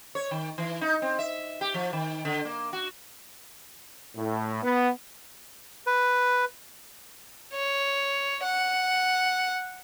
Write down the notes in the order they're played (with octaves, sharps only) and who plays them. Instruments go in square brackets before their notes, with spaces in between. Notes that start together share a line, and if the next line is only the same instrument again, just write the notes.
[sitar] C#5
D#3
E3
D#4
C4
E5
G4
F3
D#3
D3
A#3
F#4
[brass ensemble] A2
B3
[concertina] B4
[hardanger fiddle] C#5
F#5